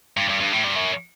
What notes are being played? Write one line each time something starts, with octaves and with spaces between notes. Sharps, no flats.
G2
G2
G2
A2
G2
F#2